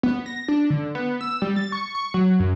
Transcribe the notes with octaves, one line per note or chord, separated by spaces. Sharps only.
B3
A#6
D4
D3
B3
E6
G3
A6
C#6
C#6
F#3
F#2